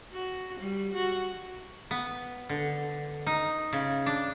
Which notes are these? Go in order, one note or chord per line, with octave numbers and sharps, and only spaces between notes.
F#4
G3
F#4
B3
D3
D#4
C#3
D4